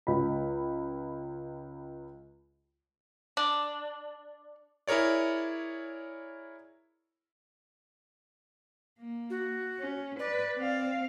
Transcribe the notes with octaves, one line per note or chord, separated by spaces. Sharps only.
C#2 B5
D4
E4 G#4 A#4 C#5 D5
A#3
F#4
C#4
B4 D5
C4 F5